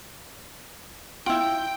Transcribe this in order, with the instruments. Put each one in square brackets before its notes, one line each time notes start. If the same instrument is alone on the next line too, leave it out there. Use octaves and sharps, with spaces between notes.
[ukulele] E4 F4 [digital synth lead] G5